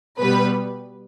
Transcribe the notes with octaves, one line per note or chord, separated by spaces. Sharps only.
B2 G3 B3 B4